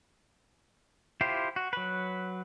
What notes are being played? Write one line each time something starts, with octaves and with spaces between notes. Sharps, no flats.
E4 F4 G4 C5
F#4
F#3 B4